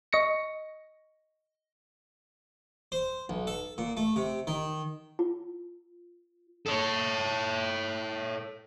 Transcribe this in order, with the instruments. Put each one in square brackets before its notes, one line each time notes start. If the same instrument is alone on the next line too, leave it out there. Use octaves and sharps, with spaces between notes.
[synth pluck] D#5 C#6 A#6 C#7
[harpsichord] C5
B1
A4
A#2
A3
C3
D#3
[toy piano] F4
[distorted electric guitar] A4 C#5